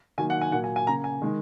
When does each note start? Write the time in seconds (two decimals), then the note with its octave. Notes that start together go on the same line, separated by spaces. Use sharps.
0.18 D#3 F#3 A#3 G#5
0.30 F#5
0.41 G#5
0.52 A#2 F#3 A#3 F#5
0.64 G#5
0.76 G#5
0.87 C#3 A#3 A#5
1.04 G#5
1.22 D#3 G#3